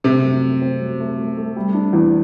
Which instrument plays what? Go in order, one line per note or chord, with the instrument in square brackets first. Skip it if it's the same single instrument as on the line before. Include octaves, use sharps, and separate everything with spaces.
[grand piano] C3 [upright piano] A3
[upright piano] F#2
A3
C4
F#3
A3
A3
A3
G3
D4
E2